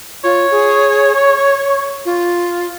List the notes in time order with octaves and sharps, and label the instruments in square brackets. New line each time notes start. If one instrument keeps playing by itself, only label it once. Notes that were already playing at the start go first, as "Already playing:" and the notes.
[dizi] F4 [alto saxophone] C#5
[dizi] G#4
C#6
F4